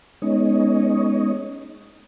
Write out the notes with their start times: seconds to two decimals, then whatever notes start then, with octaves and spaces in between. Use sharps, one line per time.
0.22 G#3 B3 C#4 D#4 C#5 D#5